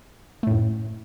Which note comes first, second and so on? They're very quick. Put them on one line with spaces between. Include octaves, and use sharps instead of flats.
A3 A2 F#2